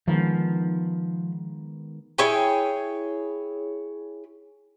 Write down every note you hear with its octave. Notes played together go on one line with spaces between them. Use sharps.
D#3 F3 G#3 B3
E4 G#4 C#5 G5